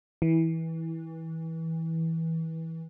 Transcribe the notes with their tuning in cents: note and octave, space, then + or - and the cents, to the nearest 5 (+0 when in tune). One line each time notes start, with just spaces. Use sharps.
E3 -20